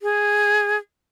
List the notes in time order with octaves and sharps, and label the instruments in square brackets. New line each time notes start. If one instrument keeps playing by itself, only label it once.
[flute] G#4